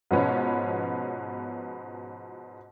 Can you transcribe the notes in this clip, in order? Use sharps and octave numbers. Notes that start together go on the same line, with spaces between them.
G#2 B2 F3 B3 C#4